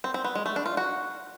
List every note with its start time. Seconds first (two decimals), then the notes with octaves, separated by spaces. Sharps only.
0.04 C4
0.14 C4
0.24 B3
0.35 G#3
0.46 A3
0.56 D4
0.66 F4
0.77 F#4